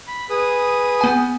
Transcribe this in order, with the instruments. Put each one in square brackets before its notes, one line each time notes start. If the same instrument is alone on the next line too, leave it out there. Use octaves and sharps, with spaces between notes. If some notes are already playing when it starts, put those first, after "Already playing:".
[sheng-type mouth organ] B5
G#4 B4 D#6
[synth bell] B3 G#5